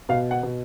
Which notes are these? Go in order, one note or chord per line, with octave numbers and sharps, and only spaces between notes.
B2 F5
F#5
B2